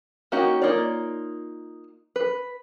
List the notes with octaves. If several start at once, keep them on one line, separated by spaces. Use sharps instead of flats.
A#3 C#4 D#4 F#4 G4
A#3 D#4 F4 C#5 D5
B4